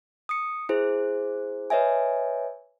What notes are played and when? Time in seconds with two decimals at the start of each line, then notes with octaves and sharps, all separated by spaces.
0.29 D#6 C#7
0.69 E4 G#4 C5
1.70 B4 C#5 D#5 E5 G#5